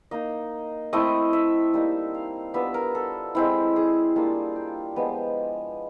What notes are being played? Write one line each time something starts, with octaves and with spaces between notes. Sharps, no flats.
A#3 D#4 D#5
A3 C4 E4 D#5
E5
G3 A#3 D#4
F5
G3 B3 D4 F4 E5
A#4
A4
G#3 C4 E4
G#4
G3 A#3 D4 F4
G4
F3 G#3 B3